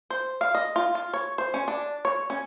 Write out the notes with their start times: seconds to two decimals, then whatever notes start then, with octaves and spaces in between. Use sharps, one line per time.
0.10 C5
0.41 F5
0.55 D#5
0.76 F4
0.95 F4
1.14 C#5
1.38 C5
1.54 C#4
1.68 D4
2.05 C#5
2.30 C#4